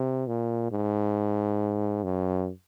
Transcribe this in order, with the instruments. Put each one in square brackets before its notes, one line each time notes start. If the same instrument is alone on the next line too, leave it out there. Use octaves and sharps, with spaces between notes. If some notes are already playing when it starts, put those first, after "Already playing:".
Already playing: [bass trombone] C3
A#2
G#2
F#2